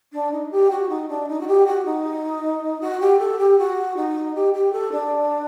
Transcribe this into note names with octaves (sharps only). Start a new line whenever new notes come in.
D4
D#4
G4
F#4
D#4
D4
D#4
F#4
G4
F#4
D#4
F#4
G4
A4
G4
F#4
D#4
G4
G4
A4
D4